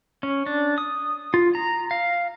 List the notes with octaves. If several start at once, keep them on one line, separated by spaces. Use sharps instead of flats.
C#4
D4
D#6
F4
A#5
F5